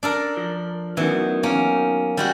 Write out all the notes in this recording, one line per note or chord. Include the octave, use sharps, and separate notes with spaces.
D4 A4 A#4
F3
F#2 B2 D#3 E3
A#3 C#4
G3 G#3 F#4